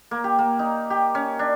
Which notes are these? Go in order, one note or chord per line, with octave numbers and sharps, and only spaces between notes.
A#3
G4
A#3
D#4
G4
C#4
D4